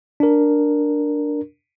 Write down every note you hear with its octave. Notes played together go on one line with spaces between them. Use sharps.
D4 A#4